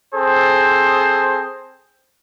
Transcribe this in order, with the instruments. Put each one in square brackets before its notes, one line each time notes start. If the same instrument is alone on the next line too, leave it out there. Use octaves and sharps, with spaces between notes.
[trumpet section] C4 G#4 A4 C5